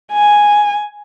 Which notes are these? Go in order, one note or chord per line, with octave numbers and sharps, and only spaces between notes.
G#5